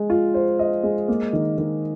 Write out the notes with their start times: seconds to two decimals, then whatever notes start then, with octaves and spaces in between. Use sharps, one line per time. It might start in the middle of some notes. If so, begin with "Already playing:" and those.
Already playing: G#3
0.10 F4
0.34 C5
0.59 D#5
0.83 G#3
1.08 A#3
1.33 D#3
1.58 D#3